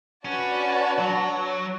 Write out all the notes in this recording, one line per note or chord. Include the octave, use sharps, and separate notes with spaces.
C#4 D4 F#4 B4 D5 A5
F#3